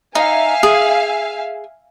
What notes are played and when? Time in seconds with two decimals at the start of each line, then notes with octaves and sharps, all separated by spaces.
0.15 D#4 E5 F5 G#5
0.63 G#4